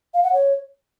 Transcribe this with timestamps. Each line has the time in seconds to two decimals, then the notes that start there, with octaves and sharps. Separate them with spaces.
0.14 F5
0.24 F#5
0.33 C#5